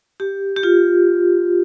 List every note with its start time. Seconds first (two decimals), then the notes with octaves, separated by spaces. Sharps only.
0.20 G4
0.56 G4
0.63 F4